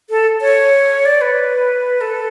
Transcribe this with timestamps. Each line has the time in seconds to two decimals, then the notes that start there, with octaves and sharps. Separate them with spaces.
0.10 A4
0.41 C#5
1.05 D5
1.21 B4
2.01 A4